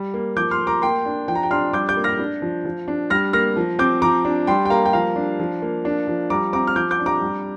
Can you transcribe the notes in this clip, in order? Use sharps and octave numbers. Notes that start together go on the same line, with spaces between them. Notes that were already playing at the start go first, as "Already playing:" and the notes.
Already playing: G3
A#3
F3 D6 G6
C6 F6
A#3
A#5 D6
A#3 G5 C6
D4
F3 G5
A#5
G5
D4 C6 F6
G3 D6 G6
D6 G6
A#3
F6 A#6
D4
F3
F3
D4
G3 F6 A#6
A#3 F6 A#6
F3
C4 D6 G6
F3 A#5 D6
D4
G3 G5 C6
G5
A#3 F5 A#5
G5
F3 F5 A#5
D4
F3
A#3
D4
F3
G3 A#5 D6
C4 A#5 D6
F6
F3 D6 G6
D6 G6
D4
A#5 D6
G3